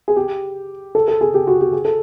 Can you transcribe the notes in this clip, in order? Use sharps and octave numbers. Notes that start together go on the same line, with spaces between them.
G#4
G4
A4
A4
G#4
G4
F#4
G4
G#4
A4